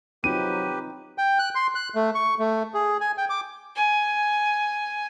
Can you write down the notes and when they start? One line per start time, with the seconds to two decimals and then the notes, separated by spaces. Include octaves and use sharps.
0.24 F#3 C4 D#4 F4 G4 B4 D#7
1.18 G5
1.39 F#6
1.55 C6
1.75 F#6
1.95 A3
2.15 C#6
2.39 A3
2.74 G#4
3.01 G#5
3.18 G5
3.30 D6
3.75 G#5